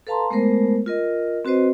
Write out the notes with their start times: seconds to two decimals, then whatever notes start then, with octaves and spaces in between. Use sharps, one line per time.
0.07 A4 B4 F5 A5 A#5 C6
0.30 G#3 A3 B3 A#4 C5
0.86 F4 A#4 D#5
1.45 C4 F#4 B4 C5 D#5